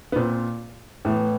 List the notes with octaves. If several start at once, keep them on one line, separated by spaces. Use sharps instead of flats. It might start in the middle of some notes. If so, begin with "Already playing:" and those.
B3
A#2 C4
A2 E3 B3